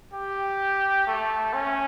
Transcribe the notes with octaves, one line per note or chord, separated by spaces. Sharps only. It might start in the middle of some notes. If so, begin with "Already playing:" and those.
G4
A3
C#4